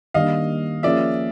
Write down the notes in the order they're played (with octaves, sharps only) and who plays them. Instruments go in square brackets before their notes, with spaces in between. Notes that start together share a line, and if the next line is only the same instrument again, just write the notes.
[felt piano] D#3 G3 A#3 D4 [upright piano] D#5 F5
[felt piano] F3 A#3 C#4 F4 G#4 [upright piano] D5 E5